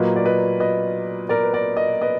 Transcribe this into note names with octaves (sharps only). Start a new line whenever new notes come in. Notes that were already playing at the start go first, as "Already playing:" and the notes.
Already playing: A#2 F#3 A#3 B4 D#5
D5
B4 D#5
B4 D#5
A#4 D5
B4
A#4 D5
D#5
B4 D#5